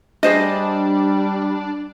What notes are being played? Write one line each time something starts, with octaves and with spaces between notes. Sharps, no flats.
G3 D4 G#4 C5 D#5